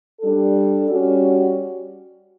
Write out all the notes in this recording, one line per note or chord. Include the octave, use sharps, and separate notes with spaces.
G3 D4 A4
G3 C#4 F#4